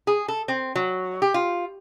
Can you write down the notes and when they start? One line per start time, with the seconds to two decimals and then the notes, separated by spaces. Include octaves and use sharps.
0.07 G#4
0.28 A4
0.48 C4
0.76 F#3
1.22 G4
1.34 F4